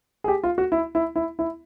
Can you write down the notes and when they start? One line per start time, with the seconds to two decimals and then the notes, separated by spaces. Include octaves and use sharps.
0.24 G#4
0.28 G4
0.43 F4
0.58 F#4
0.72 E4
0.95 E4
1.16 E4
1.39 E4